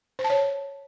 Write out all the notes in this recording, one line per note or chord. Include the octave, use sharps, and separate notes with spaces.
C5
A5
C#5